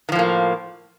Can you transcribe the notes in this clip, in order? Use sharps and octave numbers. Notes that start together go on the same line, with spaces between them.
A2 D#3 F3 A#3